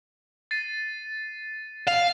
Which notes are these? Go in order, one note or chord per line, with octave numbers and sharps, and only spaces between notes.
A6 C7 D#7
F5